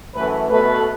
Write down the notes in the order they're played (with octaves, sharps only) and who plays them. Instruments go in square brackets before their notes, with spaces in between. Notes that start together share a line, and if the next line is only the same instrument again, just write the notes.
[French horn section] F#2 E3 A3 B4
B2 A3 B4